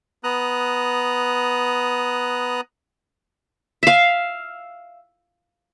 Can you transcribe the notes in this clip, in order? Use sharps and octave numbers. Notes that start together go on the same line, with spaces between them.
B3 A#5 D#6 F#6
E5 F5